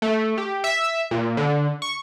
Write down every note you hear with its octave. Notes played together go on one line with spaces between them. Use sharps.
A3
G4
E5
A#2
D3
C#6